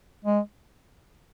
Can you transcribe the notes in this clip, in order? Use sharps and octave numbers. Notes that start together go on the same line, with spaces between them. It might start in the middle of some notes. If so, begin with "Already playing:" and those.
G#3